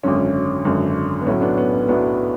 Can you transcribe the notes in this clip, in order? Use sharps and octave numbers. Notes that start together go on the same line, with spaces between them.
G#1 F#2 D3 C#4
G#1 F#2 D3
B3
B1 A2 F#3 C#4
B3 D4
B3
C#4
B1 A2 F#3 B3 D4